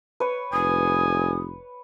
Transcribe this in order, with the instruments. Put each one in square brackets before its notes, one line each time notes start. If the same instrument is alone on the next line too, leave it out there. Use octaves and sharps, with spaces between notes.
[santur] B4 C#5
[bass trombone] F1 [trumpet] G#5 [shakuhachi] D#6